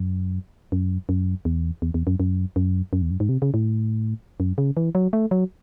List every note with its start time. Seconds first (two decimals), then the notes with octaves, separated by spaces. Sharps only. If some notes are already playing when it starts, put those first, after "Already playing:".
Already playing: F#2
0.72 F#2
1.09 F#2
1.45 E2
1.82 E2
1.94 E2
2.07 F#2
2.20 F#2
2.56 F#2
2.93 F#2
3.02 E2
3.11 F#2
3.20 G#2
3.29 C3
3.42 C#3
3.54 A2
4.40 F#2
4.58 C#3
4.77 E3
4.95 F#3
5.13 A3
5.31 F#3